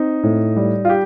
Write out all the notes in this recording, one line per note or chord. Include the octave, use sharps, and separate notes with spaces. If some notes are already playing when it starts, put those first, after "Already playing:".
Already playing: C4 D#4
A2
G3
F4
G4